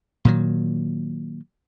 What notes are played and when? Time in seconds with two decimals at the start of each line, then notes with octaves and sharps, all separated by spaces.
0.25 A#2 D#3 F#3